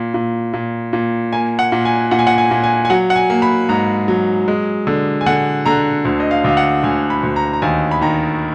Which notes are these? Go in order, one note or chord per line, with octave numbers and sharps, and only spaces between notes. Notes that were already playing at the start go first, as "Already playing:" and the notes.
Already playing: A#2
A#2
A#2
A#2
A#3 G#5
F#5
A#2
G#5
A#2 F#5
G#5
F#5
G#5
A#2
G#5
G#5
F#3 F#5
F#5
G#5
A#3
B5
G#2 A#5
F#3
G#3
D3
G#5
D3 F#5
D3 A#5
D2
D#5
F5
D2 F5
F#5
D2 G#5
B5
D2
A#5
A#5
D#2 G#5
B5
D#3 A#5